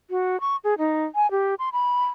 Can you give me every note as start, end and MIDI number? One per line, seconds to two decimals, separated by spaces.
0.10 0.40 66
0.41 0.56 85
0.64 0.74 68
0.78 1.05 63
1.15 1.30 80
1.31 1.55 67
1.59 1.69 84
1.73 2.05 83